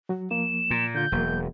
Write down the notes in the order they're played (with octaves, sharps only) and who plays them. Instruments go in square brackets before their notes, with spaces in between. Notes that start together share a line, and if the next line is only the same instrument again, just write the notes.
[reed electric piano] F#3 F#4
[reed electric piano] F3 A#3 [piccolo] E7
[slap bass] A#2
[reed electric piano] D3 F4 [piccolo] G6
[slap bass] E1 [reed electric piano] F#3 A#3